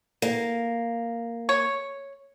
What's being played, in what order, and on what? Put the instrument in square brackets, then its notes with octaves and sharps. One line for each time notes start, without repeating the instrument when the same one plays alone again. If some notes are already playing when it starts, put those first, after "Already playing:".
[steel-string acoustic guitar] A#3
[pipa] C#5